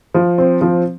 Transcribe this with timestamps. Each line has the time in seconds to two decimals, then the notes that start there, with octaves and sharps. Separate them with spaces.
0.14 F3
0.38 C4
0.61 F3